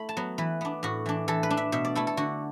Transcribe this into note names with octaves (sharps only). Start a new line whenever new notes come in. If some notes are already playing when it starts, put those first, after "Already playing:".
Already playing: A3 E4 B5
A5
F#3 B3
E3 B4
B3 D4
A2 F#4
E3 D4
E3 A4
B4
D4
E5
B2 E5
D5
A3 E4 A4
A4
D3 F#4